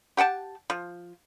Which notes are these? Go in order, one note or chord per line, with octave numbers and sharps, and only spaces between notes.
G4 F#5 G5 A5
F3